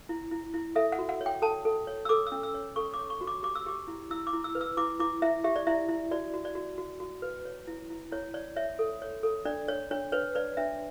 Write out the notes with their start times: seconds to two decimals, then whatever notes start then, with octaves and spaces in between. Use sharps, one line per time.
0.09 E4
0.31 E4
0.54 E4
0.76 A4 E5
0.92 F#5
0.99 F#4
1.09 F#5
1.21 C#5
1.26 G5
1.42 A4 A5
1.65 A4
1.87 C#5
2.05 E6
2.09 A4 D6
2.27 E6
2.32 C#4
2.43 E6
2.54 C#5
2.76 A4 C#6
2.94 D6
2.99 C#5
3.10 C#6
3.21 F#4
3.27 D6
3.43 G4 D6
3.55 E6
3.66 G4 D6
3.88 E4
4.11 E4 E6
4.27 D6
4.33 E4
4.44 E6
4.55 B4
4.61 E6
4.77 E4 D6
5.00 E4 D6
5.22 E4 E5
5.44 G4 E5
5.56 D5
5.67 E4 E5
5.89 E4
6.11 F#4 D5
6.34 F#4
6.45 D5
6.55 F#4
6.78 F#4
7.00 F#4
7.22 B4
7.45 C#5
7.68 E4
7.90 E4
8.12 E4 C#5
8.34 C#5 D5
8.56 C#5 E5
8.79 A4
9.02 C#5
9.23 A4
9.45 D4 D5
9.68 C#5
9.91 D4 C#5
10.12 B4 C#5
10.35 B4 D5
10.57 D4 E5